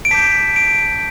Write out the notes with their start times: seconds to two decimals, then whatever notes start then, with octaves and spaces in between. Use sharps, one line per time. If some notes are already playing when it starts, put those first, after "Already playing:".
0.05 D7
0.11 A5 D6 G6 B6
0.56 D7